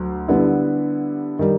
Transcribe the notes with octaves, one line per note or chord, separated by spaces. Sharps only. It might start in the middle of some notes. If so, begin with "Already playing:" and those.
Already playing: D2 F#3
D3 G3 B3 E4
D#3 G3